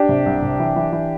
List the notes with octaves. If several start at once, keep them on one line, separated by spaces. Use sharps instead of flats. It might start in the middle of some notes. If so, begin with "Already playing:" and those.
Already playing: D4 G4
C3
C2
C3
E3
E3
E3